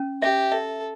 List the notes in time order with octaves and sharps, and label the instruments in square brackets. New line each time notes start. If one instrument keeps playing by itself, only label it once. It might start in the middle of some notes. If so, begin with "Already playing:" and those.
Already playing: [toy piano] C#4
[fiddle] G4 [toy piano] E5
[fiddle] A4 [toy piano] E5